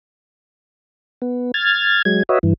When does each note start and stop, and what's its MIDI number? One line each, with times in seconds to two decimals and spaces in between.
1.22 1.51 59
1.54 2.02 89
1.54 2.02 92
1.54 2.02 93
2.05 2.23 54
2.05 2.23 56
2.05 2.23 92
2.29 2.39 66
2.29 2.39 71
2.29 2.39 73
2.29 2.39 75
2.29 2.39 76
2.43 2.54 43
2.43 2.54 52